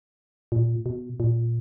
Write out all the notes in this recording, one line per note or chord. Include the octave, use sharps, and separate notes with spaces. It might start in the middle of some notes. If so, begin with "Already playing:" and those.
A#2
B2
A#2